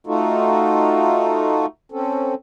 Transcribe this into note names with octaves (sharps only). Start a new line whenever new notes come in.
A3 D#4 F4 F#4 A4
C4 C#4 A4